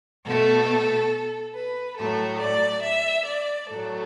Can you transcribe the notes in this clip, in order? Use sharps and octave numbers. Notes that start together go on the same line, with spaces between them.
B2 A3 A4
B4
A2 F#3 A3 A4
D5
E5
D5
A2 F#3 A3 A4